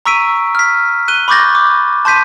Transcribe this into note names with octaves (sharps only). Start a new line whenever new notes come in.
A#5 C#6 E6 B6 D7 D#7
F6 B6
F#6 D#7 G7
B5 C#6 D6 G6 A6 A#6
D6
A5 C6 G6 B6 D#7